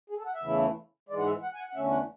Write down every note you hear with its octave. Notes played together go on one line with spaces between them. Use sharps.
G#4
A4
F#5
E5
E2 C#3 E3 A3 E4
G#2 E3 G#3 D5
F#5
E5
F#5
G#5
F#5
F#5
E2 D3 A3 C#4 E5
F#5